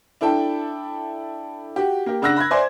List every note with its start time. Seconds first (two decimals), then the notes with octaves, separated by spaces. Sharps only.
0.21 D4 E4 A4 G5 A5
1.76 F#4 G4
2.06 A#3 G4
2.22 C#3 D4 F#5 E6 F#6 A#6
2.37 B5 F#6 G#6
2.51 C5 D5 E5 G#5 C6